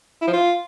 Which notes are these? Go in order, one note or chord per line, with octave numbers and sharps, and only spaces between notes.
E4
F3
F4